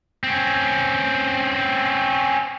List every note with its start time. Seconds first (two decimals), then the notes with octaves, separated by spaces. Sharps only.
0.24 C4 C#4